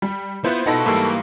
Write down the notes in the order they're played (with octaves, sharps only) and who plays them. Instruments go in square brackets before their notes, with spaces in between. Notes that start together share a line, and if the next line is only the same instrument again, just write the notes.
[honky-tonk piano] G3
[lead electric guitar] B3 [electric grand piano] E4 F4 B4 [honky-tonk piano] C5
[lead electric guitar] B2 F#5 [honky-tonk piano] D#4 B5 A#6 [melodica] A4
[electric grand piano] G#2 E3 G3 [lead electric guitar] A#3 [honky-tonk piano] B5 C#6 E6